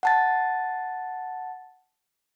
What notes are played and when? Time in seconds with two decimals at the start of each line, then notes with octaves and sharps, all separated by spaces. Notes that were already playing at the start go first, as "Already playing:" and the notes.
0.03 F#5 A5 A6